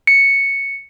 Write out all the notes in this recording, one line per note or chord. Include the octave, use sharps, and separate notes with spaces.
C#7